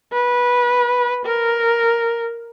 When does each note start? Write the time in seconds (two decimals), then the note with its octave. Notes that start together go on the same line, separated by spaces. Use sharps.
0.13 B4
1.26 A#4